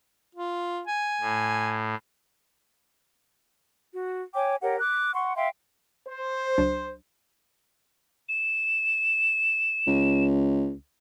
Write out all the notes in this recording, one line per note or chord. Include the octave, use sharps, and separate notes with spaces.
F4
G#5
A2
F#4
C#5 G5 G#5 D6
G4 A#4 C#5 F#5
D6 F#6
F#5 C6 C#6
E5 F5 G5 C6
C5
C#2 F#3 D4
E7
C#2